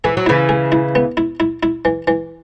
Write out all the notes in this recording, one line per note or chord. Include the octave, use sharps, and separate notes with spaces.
E3 G#4
F#3
C#3 E3 E4
G#4
E4
B3
E4
E4
E4
E3
E3